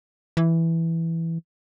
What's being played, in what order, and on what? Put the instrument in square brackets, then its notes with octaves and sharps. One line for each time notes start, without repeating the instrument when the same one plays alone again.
[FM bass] E3